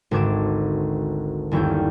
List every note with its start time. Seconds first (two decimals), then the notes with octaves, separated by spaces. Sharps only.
0.11 G#1 D2 D6 G#6 E7
1.51 G1 D#2 C#4 E4 G5